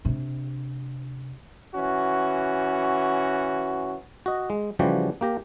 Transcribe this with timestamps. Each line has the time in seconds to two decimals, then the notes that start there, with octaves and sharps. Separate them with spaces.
0.05 C3 D4
1.75 E3 C#4 F#4
4.26 F#4 D#5
4.50 G#3
4.79 C#3 E3 F3 G3 F#4 G4
5.21 A#3 G4 A#5